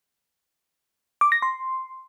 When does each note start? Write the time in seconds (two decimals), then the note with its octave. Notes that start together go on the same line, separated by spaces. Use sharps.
1.21 D6
1.32 A#6
1.42 C6